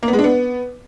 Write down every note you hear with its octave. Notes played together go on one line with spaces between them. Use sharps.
A#3
B3
G#3
D4
B3